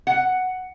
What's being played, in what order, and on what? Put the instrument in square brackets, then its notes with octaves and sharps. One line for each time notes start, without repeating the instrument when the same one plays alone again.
[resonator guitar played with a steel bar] F#5